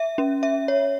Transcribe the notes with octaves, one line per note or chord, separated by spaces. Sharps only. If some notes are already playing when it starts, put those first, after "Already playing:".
Already playing: E5
C#4
E5
C#5